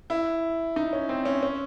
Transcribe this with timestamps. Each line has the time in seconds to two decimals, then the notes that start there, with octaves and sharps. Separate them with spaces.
0.10 E4
0.76 D#4
0.93 C#4
1.09 C4
1.25 C#4
1.43 C#4